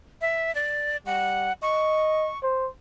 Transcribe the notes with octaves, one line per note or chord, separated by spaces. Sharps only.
E5
D5
G3 F#5
D#5 C#6
C5